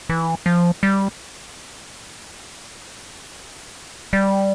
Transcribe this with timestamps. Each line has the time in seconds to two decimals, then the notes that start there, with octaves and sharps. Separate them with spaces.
0.09 E3
0.46 F3
0.83 G3
4.13 G3